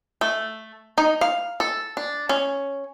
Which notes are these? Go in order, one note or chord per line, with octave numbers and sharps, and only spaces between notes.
A3
D#4
F5
A4
D4
C#4